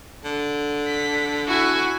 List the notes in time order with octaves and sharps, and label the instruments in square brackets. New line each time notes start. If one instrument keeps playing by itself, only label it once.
[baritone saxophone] D3
[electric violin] B6
[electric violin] E4 G#5 [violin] F#4